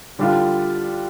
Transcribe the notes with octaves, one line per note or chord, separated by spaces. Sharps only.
D3 G3 D4 F4